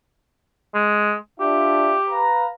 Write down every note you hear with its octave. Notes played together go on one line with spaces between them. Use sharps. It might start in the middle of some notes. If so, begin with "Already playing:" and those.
G#3
D4 F4 G4 E5
B4 F5 A#5